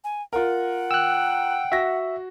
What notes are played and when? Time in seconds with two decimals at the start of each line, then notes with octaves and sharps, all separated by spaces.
0.04 G#5
0.33 F4 A#4 F#5
0.91 G5 E6 F#6
1.72 F#4 E5 A#6